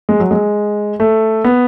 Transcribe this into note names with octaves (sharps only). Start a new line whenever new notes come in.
G#3
F#3
G#3
A3
B3